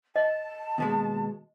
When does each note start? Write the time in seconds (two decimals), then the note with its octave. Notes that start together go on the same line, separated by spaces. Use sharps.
0.16 D#5 A5
0.78 D#2 B2 G#3